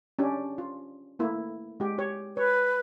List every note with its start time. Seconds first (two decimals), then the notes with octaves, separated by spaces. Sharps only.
0.19 C#4 D4 G4
0.58 F4
1.19 A3 A#3 E4
1.80 G#3 G4
1.98 G4 C#5
2.37 B4 C#5